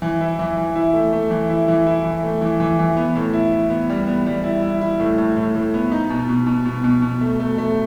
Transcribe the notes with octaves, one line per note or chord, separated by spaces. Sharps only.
E3
E4
E3
E3
E4
A3
A3
E3
E4
E3
E4
E3
A3
E3
E3
E3
B3
A2
E4
E4
B3
G3
B3
G3
E4
E4
E4
A2
A2
A2
A2
B3
D#4
B2
B2
B2
B2
B2
B2
A3
A3
A3